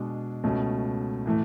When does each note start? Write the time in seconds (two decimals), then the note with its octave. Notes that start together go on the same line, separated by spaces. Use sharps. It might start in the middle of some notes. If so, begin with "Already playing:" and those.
Already playing: B2 G#3 D4
0.44 C#2 B2 A3 C#4
1.26 A2 E3 A3